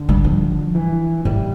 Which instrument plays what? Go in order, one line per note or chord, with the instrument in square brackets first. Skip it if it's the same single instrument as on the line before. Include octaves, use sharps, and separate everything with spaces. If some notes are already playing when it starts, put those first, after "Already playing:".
Already playing: [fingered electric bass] D3
[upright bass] G3
F3
[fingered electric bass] E3
[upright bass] E3 [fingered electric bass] G3